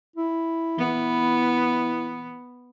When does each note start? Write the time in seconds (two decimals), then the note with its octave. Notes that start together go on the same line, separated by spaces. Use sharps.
0.16 E4
0.78 E3 B3